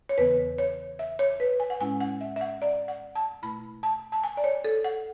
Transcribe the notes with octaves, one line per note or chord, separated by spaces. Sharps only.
C#5
E2 C#3 E3 B3 B4
C#5
E5
C#5
B4
G#5
F#5
A2 G#3 C#4 E4 G#5
F#5
E5
E5
F#5
D5
F#5
A5
B2 A3 E4 B5
A5
A5
G#5
D5
C#5
A4
F#5